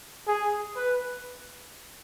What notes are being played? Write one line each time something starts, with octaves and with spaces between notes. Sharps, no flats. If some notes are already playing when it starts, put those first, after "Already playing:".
G#4
B4